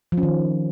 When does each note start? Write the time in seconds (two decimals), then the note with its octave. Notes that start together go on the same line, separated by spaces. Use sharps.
0.12 F3
0.18 C#4
0.23 D#3